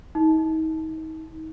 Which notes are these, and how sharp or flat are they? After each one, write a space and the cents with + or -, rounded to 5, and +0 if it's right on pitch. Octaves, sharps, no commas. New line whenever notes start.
D#4 +35